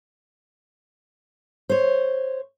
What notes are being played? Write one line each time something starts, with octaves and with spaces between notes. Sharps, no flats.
C5 C#5